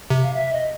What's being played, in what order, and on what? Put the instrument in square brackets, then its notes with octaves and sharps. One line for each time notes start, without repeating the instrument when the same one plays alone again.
[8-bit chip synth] C3
[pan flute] F5
E5
D#5